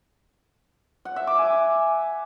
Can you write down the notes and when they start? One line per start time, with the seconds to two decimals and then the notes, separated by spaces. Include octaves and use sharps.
1.05 F#5
1.16 E5
1.27 D6
1.38 G#5